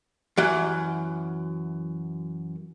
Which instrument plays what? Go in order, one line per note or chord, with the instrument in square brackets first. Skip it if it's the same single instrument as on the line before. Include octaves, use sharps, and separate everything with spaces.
[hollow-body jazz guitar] F#2 E3 F#5